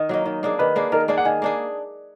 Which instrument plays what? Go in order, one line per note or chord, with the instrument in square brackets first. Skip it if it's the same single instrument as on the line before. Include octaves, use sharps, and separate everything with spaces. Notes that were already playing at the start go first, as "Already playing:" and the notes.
Already playing: [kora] D#3 [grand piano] D#5
[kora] F#3 A#3 D#4
D#3
A#3 D4 G#4
[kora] D#3 [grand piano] B4
[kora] A#3 D4 G#4
[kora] D#3 [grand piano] A#4
[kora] A#3 D4 G#4 [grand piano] D5
[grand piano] F#5
[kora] D#3 [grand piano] G#5
[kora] A#3 D4 G#4